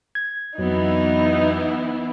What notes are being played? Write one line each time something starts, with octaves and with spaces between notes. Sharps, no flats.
G#6
F2 E3 F#3 B3 D#4 E4